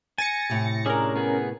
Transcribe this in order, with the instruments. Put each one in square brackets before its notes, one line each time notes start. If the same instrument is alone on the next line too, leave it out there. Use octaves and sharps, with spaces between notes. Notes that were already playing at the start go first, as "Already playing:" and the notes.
[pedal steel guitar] G#5 [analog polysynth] A6 A#6 C#7
[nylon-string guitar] A2 C3
[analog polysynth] C#4 A#4 [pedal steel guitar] D4 G#4
[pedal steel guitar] B3 G#4